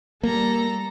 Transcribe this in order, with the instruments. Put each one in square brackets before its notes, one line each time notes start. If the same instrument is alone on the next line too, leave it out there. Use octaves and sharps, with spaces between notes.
[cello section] G3 [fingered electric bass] A#3 [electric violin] A4 A#5